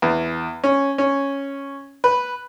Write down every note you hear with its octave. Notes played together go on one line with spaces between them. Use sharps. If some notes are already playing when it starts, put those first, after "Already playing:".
E2
C#4
C#4
B4